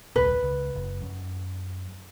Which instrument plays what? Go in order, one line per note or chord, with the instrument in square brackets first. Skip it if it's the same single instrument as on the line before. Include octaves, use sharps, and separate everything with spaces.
[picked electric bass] D#1 C2 [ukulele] B4
[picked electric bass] C#2
F#1
F#2